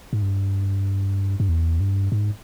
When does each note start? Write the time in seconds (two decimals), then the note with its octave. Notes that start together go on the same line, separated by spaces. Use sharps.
0.13 G#2
0.22 G2
1.40 G2
1.49 E2
1.80 G2
2.12 G#2